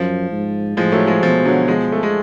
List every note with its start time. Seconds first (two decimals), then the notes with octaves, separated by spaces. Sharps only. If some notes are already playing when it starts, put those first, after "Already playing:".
Already playing: F#2 F3
0.31 G#2
0.77 A2 F3 G#3
0.92 F#3 A3
1.07 F3 G#3
1.22 B2 F3
1.45 D3 F#3
1.68 F3 G#3
1.92 A3
2.03 G#3